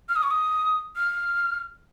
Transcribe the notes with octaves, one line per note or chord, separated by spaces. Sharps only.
F6
D#6
C#6
D#6
F6